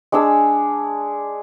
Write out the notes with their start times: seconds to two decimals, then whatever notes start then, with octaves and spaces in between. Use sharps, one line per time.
0.12 G#3 D4 G#4 E6